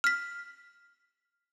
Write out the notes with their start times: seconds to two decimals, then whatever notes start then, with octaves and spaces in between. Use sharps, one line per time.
0.04 F6 B6